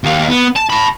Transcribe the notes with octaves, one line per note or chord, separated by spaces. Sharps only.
D#2 F5
B3
A5
A5 B5